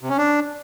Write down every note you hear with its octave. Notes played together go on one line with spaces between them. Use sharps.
C3
C#4
D4